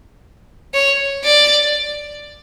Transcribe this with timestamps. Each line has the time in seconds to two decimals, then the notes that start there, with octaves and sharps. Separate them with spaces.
0.74 C#5
1.24 D5